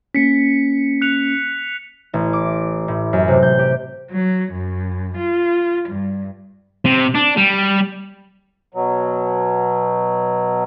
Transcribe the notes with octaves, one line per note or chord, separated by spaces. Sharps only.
A#3 C#4 B6 C#7
F#6 C#7 F7
A1
D6
A2
F#2
C3
G6
G4
F#3
F#2
F4
G2
C3
D4
G3
B2 F#3